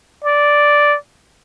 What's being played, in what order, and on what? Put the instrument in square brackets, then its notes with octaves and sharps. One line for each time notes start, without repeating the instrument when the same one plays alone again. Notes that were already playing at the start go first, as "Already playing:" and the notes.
[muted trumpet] D5